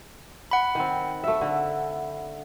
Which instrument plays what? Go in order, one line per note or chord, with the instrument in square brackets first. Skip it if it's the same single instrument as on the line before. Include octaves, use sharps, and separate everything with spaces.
[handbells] F#5 B5
[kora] D#3 C4
A3 E5
D3